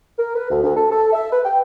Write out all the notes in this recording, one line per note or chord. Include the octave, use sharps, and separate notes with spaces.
A#4
B4
D2
D2
A4
A4
E5
B4
G5